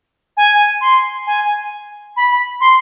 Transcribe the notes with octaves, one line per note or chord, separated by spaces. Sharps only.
G#5
C6
G#5
B5
C6